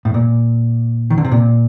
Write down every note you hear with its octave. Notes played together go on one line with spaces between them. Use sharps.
A2
A#2
D#3
D3
C3
A#2